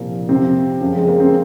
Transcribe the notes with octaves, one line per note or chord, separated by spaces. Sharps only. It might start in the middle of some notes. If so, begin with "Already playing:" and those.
Already playing: C2 A#2 F3 A#3
F2 C3 F3 C4
F#2 C#3 F3
G#3
A#3
C4